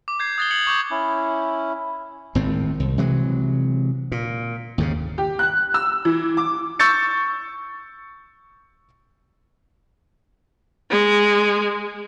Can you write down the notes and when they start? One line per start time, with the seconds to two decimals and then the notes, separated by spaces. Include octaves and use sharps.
0.08 D6
0.20 G6 G#6 C7
0.38 D#6 F#6 A6 C7 G7
0.50 G#6 C#7 F#7
0.67 C#6 D6 G6
0.91 C#4 E4
2.35 G#1 A2 C4
2.80 C2
2.98 C3 E3 F#3 G#3
4.12 A#2
4.78 D#2 G#2 C#3
5.18 G4
5.39 F#6
5.74 E6
6.05 E3
6.37 D6
6.79 C#6 E6 G6 A6 C#7
10.90 G#3